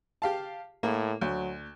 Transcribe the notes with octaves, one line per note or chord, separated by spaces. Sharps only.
G4 F5 A5
A2 A#3
D2 F#3